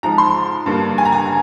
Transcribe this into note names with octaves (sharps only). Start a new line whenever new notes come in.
G#2 F3 G#3 A#5
C6
G2 D3 G3 A#3
G#5
A#5
G#5